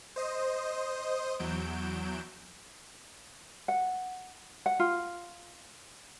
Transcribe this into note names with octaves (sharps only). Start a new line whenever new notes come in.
C5 D#5 D#6
E2 F#3 G6 D7 E7
F#5
F#5
F4